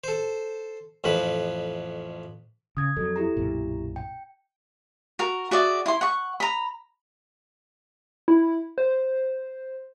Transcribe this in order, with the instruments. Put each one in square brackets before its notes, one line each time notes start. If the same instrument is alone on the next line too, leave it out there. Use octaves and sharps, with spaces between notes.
[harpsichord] A4 C5
A1 F2 F3 B4
[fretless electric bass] C#3 [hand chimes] D#6 G#6
[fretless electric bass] F2 F#3 [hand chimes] A4
[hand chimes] E4 G4 A#5
[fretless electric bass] B1 F#2 A#2
[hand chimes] G5
[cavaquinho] F#4 A#4
F#4 G#4 D5 E5
E4 C6
F#5 C#6
A#5 B5
[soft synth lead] E4
C5